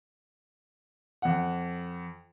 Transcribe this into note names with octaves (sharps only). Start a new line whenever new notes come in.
F2 F#5